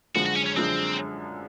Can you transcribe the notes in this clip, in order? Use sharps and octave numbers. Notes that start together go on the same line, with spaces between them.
F#2 D3 F3 G#3 F#4
F#4
C#4
C#4
F#2 D3 F3 G#3 C4